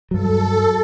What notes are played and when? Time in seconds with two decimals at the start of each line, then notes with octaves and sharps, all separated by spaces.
0.11 G2 F#3 A4